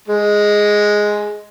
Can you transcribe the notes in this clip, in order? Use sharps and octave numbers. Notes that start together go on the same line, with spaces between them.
G#3